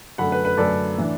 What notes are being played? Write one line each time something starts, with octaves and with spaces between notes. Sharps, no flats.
F#2 D3 A3 F#5 B5
B4
B4
F#2 D3 A3 A4 D5
A2 E3 D4